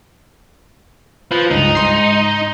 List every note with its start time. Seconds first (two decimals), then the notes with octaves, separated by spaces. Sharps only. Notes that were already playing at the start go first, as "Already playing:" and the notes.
1.31 F3 F4 B4
1.51 C#2 G2 D#4
1.75 G#2 C6 C7